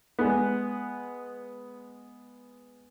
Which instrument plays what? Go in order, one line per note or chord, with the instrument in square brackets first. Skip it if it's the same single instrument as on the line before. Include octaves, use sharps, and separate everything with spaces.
[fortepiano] G#3 B3